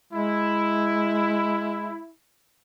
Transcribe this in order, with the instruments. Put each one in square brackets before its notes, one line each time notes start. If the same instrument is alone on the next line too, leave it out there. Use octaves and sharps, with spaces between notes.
[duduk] G#3 [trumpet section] E4